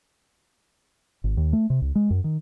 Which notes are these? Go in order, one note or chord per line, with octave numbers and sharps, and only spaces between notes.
G#1
D#2
A3
C3
C#2
G#3
F#2
D#3